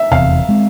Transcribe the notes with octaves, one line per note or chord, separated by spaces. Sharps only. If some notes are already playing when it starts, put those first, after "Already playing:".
Already playing: E5
F1 E2 C3 F5
G#3 C4